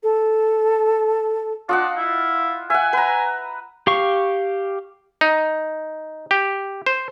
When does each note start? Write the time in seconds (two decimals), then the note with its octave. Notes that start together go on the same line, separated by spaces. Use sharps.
0.03 A4
1.69 D4 F4 D#5 F#5
1.97 E4
2.70 E5 F#5 G#5
2.93 B4 A#5
3.87 G4 F5 C#6
5.21 D#4
6.31 G4
6.87 C5